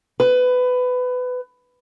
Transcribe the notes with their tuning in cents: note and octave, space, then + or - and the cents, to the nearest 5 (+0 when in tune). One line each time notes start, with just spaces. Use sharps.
B4 +20